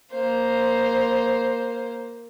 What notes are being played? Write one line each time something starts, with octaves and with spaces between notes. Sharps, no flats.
A#3 C5